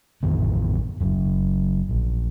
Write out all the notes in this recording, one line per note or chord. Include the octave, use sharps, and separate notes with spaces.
A1 F2 D#3 B3
F#1 F#2
A#1